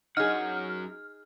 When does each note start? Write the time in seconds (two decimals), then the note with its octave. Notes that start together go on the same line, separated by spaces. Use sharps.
0.17 F#2 F#3 D#4 G#4 F#5 F6